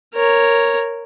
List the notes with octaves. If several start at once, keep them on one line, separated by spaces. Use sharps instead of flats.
A#4 C#5